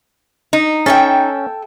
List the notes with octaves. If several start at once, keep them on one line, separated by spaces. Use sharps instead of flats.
D#4
C#4 A4 E5 G5